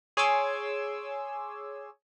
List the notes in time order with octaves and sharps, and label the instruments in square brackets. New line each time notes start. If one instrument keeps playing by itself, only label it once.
[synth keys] G#4 C#5 G#5 C6 D6 E6